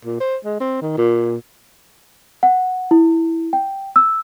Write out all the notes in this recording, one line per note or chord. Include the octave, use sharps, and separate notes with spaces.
A#2
C5
G#3
C4
D#3
A#2
F#5
E4
G5
E6